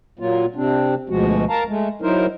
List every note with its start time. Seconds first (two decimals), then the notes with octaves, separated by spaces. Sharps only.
0.19 A#2 F#3 A#3 F4
0.56 C3 C4 D4
1.09 D2 B2 F3 G#3 F#4
1.49 A#4 F5 A5 A#5
1.67 G#3 A3
2.02 F#3 D#4 E4 A#4 C5